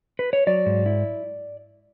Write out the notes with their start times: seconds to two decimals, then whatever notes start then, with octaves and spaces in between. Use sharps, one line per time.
0.19 B4
0.33 C#5
0.47 F#3 D5
0.66 G#2
0.86 E4